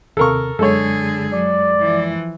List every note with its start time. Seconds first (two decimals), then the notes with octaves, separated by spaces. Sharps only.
0.17 D#2 C3 A4 A#4 C#6
0.59 F#2 D3 G#3 G#4 A4 C#5
1.33 F#3 D5
1.80 E3 F3